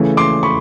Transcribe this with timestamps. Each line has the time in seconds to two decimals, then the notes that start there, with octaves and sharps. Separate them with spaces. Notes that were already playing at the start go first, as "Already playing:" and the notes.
Already playing: C#3 E3 A3
0.17 C6 D6
0.43 B5 C#6